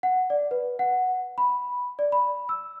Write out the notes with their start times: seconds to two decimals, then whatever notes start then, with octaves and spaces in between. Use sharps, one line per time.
0.03 F#5
0.30 D5
0.51 B4
0.79 F#5
1.38 B5
1.99 D5
2.12 B5
2.49 E6